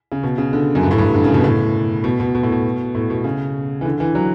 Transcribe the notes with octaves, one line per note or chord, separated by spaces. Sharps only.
C#3
B2
C#3
D3
F#2
G2
A2
G2
D3
C#3
B2
A2
B2
B2
B2
A2
B2
A2
B2
C#3
E3
D3
E3
F#3